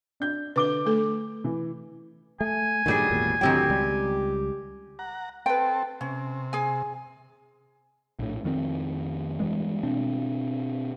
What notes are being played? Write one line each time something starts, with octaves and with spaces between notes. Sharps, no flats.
D4 G6
D3 B4 D6 G7
A3 A4
E3
A3 G#5
G2 A#2 D#3 F#3 G3 G#4
G#1 E2 A#2
D2 A2 D#3 F#3 C4 G4 G5
C#2 G3
F#5 A#5
C4 A4 B4 G5
C3 C#4
G#4 G#5
A#1 A2
F2 D#3 F#3 C4
G2 E3 G#3
B2 C4 D4